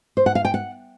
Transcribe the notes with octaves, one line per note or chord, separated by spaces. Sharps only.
C5
F#5
F5
G5
F#5